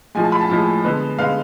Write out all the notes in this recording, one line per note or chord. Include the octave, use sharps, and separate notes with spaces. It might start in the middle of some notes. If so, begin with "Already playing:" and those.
A2 F3 G#3 G#5
A5
B5
A5
A2 F3 G#3
D3 G#3 B3
D3 G#3 B3 F5